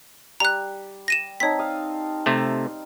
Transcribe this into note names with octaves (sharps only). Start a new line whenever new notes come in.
G3 A#5 F#6
A#6 D#7 E7
C4 D#4 C#5 A5 B6
F5 D#6
C3 A3